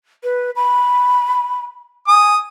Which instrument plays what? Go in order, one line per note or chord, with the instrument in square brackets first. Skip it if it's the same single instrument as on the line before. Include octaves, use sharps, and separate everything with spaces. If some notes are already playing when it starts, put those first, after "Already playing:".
[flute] B4
B5
[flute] G#5 [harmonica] D#6